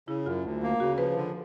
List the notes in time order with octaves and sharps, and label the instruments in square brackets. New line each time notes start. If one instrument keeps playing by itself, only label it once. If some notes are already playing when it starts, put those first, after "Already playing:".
[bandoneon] C#3 [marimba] E4
[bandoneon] F#2 [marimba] F4
[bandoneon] D2
A#3
[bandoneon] C#3 [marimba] F#4
[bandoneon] F3 [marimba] B4
[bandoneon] D3